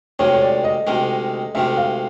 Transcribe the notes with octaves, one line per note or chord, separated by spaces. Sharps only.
D2 C3 D#3 G#3 C#5
C#5
D5
D#5
D2 C3 D#3 G#3
D2 C3 D#3 G#3 E5
F5